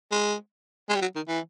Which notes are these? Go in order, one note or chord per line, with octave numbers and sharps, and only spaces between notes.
G#3
G#3
G3
F#3
D#3
E3